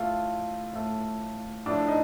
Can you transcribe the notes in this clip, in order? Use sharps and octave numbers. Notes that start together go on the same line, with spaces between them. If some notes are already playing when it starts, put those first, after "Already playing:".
Already playing: A2 A3 F4
A2 A3
A2 F3 A3 D4
D#4